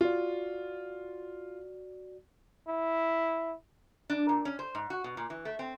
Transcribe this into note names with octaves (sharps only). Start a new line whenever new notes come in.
F4 F#4 D5
E4
D4
A#2
C#4
C5
G#2
F#4
B2
A#2
E3
A3
C4